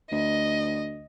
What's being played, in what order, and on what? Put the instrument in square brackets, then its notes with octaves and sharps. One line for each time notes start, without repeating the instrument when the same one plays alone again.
[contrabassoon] D2 [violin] D#5